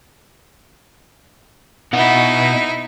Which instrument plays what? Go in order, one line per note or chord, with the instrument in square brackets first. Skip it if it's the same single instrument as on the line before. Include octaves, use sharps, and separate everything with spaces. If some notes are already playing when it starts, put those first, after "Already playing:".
[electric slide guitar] B2 B3 F#5 [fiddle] D#4 E4